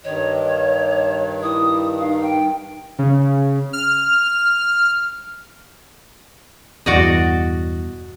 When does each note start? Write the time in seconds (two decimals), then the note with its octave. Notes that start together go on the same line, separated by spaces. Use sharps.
0.04 G2 D#3 C#5 D#5
1.43 E4 D#6
2.00 D#4 F5
2.22 G5
2.99 C#3
3.73 F6
6.86 E2 G2 B2 F#4 D5 D#5